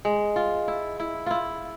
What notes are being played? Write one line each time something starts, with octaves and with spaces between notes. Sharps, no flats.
G#3
F4
E4
E4
E4 F4